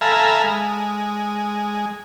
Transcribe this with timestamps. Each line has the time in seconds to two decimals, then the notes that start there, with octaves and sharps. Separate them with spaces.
0.01 A4 E5 F5 G#5 A#5 B5
0.44 G#3